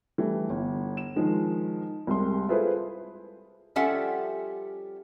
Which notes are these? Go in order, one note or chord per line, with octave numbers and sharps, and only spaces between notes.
E3 G3 A3
G1
E7
D#3 F3 G#3
C2 G3 G#3 C6
E4 F4 G#4 A4 B4 C5
F3 G3 C#4 A4 E5 F#5